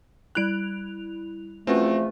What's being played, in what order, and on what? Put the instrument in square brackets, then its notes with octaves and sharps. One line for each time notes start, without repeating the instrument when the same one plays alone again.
[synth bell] G3 E4 F7 [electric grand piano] F#6 D7
[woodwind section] E2 F3 A3 [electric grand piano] C4 F#4 [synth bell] C#4 F4 B4